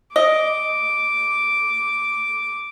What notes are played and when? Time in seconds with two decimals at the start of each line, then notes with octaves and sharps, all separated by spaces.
0.16 D#5 D6